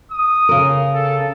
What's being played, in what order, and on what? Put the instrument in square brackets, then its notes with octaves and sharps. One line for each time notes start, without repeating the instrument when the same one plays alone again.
[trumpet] D#6
[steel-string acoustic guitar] C#3 A#4
[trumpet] A4